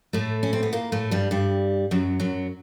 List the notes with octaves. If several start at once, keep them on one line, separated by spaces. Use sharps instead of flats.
A2 A3
C#4
C4
B3
A#2 A#3
A2 A3
G2 G3
G2 G3
F#2 F#3
F#2 F#3